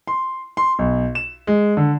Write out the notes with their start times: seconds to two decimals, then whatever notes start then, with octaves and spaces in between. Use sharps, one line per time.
0.07 C6
0.57 C6
0.79 B1
1.15 E7
1.47 G#3
1.77 D3